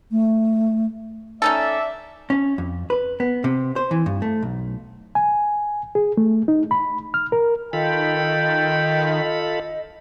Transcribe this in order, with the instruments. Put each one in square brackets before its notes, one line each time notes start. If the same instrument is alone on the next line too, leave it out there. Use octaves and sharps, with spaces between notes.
[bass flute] A3
[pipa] C#4 D#4 A4 [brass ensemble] D5 E5
[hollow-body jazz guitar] C#4
F2
B4
B3
C3
C5
E3
G2
A3
B1
[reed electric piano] G#5
G#4
A3
D#4
B5
F6
A#4
[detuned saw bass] D#3 [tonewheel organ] F4 A4 B5 [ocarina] D#5 [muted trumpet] G5